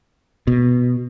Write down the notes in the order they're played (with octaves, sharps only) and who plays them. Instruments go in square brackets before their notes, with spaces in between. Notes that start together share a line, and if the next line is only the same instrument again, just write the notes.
[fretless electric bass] B2